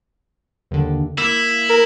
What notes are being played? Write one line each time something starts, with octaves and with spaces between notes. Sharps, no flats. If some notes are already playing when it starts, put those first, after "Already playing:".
D#2 D3
A#3 E4
A#4